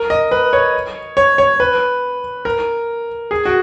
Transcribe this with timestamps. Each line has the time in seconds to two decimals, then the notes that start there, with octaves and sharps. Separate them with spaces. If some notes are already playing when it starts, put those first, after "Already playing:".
Already playing: A#4
0.10 D#5
0.31 B4
0.53 C#5
1.17 C#5
1.38 C#5
1.60 B4
2.45 A#4
3.31 G#4
3.45 F#4